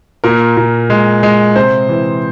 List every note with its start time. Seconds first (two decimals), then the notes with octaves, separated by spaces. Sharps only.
0.24 A#2 A#4
0.57 A#2
0.90 G#3
1.23 G#3
1.56 C3 C5
1.89 E3